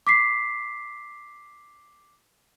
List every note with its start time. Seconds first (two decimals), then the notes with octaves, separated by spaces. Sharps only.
0.07 D6 B6 C7